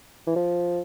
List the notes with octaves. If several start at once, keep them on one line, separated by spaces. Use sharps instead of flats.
E3
F3